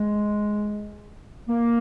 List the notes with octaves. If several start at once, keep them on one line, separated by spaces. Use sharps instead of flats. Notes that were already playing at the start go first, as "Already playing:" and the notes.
Already playing: G#3
A#3